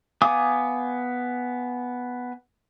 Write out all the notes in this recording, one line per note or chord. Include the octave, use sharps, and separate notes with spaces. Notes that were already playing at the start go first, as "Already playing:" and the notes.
B3 F5 G#5 D6 D#6